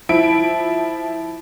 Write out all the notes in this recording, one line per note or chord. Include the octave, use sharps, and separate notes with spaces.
F3 E4 D7